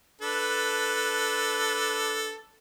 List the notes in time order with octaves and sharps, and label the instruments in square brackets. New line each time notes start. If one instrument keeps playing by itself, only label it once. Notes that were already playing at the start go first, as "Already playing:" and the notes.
[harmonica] D4 A4 B4